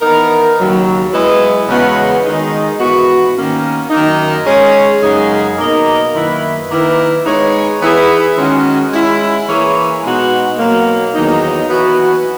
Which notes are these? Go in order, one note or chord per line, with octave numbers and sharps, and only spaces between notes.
E3 B3 D#4 A#4
D#2 C#3 F#3
G#3 B3 E4 B4 D#5
E2 C#3 G#3 B3 F#4
D#3 G#3 D#4
G#2 E3 B3 F#4
D#3 A#3 C#4
F#2 D#3 A#3 D#4
G#3 C#4 G#4 C#5
F#2 C#3 G#3 D#4 G#4
B2 A#3 D#4 A#4 D#5
F#2 D#3 A#3 E4 B4
D#3 A#3 E4 B4
G#3 B3 D#4 G#4 C#5
E3 B3 E4 G#4
D#3 G#3 C#4 F#4
G#3 C#4 E4
E3 A#3 E4 G#4 C#5
B2 G#3 B3 D#4 F#4
B2 F#3 A#3
E2 D#3 F#3 A#3 D#4
E3 B3 F#4